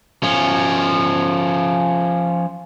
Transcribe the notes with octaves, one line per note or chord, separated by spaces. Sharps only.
F3 C#4